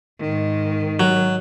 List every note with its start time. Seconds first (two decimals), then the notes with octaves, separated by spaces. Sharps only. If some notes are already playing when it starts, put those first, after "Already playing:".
0.21 G#2 D#3
1.00 F#3